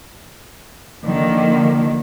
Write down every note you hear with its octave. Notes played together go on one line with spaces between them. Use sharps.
D3 D#3 F3 A#3